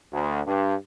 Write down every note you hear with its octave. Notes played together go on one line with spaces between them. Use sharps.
D2
G2